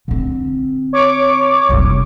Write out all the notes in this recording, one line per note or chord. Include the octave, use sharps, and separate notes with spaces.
D3 C4
C#5 C#6 D6
F#1 C2